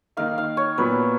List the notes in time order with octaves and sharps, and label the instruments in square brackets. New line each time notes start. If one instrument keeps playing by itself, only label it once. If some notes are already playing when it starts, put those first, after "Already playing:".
[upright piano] D#3 A#3 D#4 [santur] F5
[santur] F5
C#5
[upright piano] A#2 F#3 B3 [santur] B4